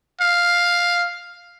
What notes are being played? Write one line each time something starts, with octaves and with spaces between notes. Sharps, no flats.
F5